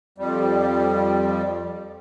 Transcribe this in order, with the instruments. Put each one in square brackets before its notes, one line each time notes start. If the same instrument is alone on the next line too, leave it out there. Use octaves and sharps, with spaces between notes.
[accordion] F2 G3